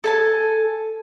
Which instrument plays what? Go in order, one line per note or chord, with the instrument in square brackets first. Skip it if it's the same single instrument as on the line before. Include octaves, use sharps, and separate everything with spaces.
[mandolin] A4 G#5 A5